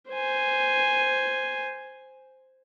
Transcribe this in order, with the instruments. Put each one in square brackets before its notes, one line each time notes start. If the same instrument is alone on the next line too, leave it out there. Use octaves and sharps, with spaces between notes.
[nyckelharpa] C5 G#5